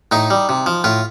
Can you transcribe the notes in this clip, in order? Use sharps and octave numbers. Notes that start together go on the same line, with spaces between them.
A2 D#4
G3
C3
F3
A2 F4